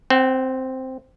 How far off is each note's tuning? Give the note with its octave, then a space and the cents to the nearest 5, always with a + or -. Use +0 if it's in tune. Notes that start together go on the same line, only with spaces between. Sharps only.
C4 +0 F#5 +40